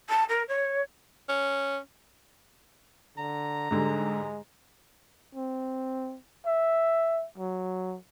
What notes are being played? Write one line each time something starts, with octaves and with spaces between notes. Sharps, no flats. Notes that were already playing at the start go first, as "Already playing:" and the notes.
A5
A#4
C#5
C#4
D3 A#5
G#2 D3 G3 G#3
C4
E5
F#3